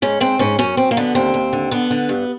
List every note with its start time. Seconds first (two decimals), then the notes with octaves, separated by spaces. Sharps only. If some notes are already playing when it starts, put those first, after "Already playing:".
0.02 G#2 C#4
0.20 G#2 C4
0.39 G#2 C#4
0.58 F#2 C#4
0.77 F#2 C4
0.91 A#3
0.97 D3 B3
1.15 D#2 C4
1.34 D#2
1.53 D3
1.71 D3 B3
1.91 D3
2.09 G2